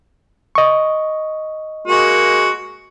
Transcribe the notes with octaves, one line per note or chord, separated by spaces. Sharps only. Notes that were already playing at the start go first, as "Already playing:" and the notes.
D#5 C#6
G#3 A#3 F#4